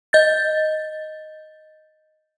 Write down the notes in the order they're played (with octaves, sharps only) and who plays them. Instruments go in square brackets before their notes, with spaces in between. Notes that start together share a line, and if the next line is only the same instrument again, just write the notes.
[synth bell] D#5 G6 A6